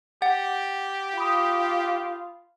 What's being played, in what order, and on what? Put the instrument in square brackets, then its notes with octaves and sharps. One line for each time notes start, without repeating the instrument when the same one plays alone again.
[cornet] G4 [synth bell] F#5 [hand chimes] A6
[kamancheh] F4 [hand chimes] B5 D#6